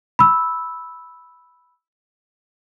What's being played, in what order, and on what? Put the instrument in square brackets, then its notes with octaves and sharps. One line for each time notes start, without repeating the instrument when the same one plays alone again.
[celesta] B5 E6